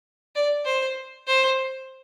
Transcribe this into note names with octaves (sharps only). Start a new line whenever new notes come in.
D5
C5
C5